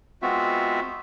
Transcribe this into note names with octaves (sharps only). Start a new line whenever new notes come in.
G#3 B3 C4 F4 F#4 E5